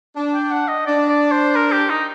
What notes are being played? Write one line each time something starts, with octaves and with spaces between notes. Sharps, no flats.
D4
G5
F#5
D#5
D4 D5
D5
C5
A#4
G4
D#4